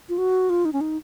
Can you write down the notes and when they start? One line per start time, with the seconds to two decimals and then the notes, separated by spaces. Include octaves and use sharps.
0.09 F4
0.18 F#4
0.50 F4
0.65 D#4
0.73 C#4
0.81 D#4